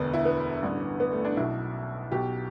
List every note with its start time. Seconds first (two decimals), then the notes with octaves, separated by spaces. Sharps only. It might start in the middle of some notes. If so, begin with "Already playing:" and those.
Already playing: E1 D2 D3 B3
0.14 E4
0.25 B3
0.62 A1 G2 D3
1.00 B3
1.12 A3
1.25 D4
1.37 B1 B2 E4
2.12 B1 B2 G4